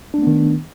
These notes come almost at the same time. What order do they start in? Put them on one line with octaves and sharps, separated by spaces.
D4 A3 B3 D#3